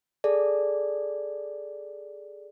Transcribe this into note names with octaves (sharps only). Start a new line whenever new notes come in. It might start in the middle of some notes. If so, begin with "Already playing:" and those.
G#4 A4 D5